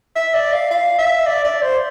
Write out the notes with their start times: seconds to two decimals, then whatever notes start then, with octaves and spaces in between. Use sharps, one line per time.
0.16 E5
0.34 D5
0.53 F5
0.71 F5
0.98 E5
1.26 D5
1.45 D5
1.62 C5